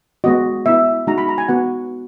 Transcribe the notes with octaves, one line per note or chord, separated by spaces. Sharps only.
G#3 B3 F#4 D#5
B3 E4 E5
G#3 D#4 F#4 A#5
B5
A#5
G#5
B3 F#4 F#5